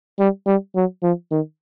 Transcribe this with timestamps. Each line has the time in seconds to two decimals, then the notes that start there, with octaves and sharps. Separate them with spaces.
0.19 G3
0.47 G3
0.76 F#3
1.03 F3
1.32 D#3